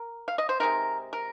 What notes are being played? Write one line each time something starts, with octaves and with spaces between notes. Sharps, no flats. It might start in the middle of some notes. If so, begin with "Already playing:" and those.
Already playing: A#4
F5
D#5
C5
C3 G#3 C4 D#4 A#4
A#4